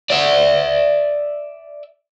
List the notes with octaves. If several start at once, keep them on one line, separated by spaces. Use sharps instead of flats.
D5 E5